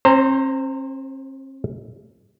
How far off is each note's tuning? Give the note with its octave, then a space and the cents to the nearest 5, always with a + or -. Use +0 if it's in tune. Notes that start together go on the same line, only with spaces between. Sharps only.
C4 +45 C5 +0 A#5 -25